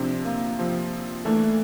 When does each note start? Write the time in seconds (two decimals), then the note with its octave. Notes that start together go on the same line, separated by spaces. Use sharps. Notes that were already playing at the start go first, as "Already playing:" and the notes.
Already playing: C3 F3 C4 D4
0.25 A#3
0.59 C3 F3 C4
1.25 E3 A3 A#3 D4